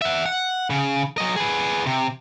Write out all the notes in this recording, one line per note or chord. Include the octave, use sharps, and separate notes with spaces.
E5 F#5
F#5
C#3
F#3 D#5
G#4 B4
C3